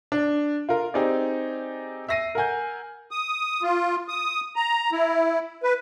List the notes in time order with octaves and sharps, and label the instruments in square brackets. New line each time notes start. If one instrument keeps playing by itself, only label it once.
[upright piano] D4
F4 A#4
C4 D#4 G4 G#4 D5
E5 E6 A#6 C7 D#7
A#4 F#5 G#5 G6
[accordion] D#6
F4
D#6
A#5
E4
B4